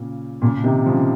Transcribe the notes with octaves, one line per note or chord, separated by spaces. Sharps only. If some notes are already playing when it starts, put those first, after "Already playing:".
Already playing: A#2 C#3
A#2 C#3
C3 D#3
C#3 F3